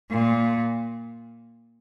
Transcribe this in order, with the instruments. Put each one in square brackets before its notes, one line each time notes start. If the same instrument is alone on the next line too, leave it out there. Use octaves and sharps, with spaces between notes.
[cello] A#2